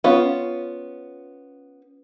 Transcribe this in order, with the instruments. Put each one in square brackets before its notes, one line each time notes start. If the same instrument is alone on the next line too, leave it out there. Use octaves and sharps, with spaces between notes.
[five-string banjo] B3 C#4 F4